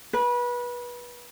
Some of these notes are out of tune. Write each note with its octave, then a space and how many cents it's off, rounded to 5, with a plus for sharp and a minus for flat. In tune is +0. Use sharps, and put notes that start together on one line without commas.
B4 -25